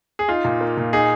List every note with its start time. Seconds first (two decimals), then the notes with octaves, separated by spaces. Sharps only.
0.19 G#4
0.28 D#4 F4
0.44 A#2
0.61 A#3
0.77 A#2
0.93 D#4 G#4